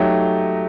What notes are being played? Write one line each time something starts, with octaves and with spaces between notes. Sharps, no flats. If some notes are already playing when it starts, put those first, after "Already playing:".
Already playing: F#3 A3 D#4 G4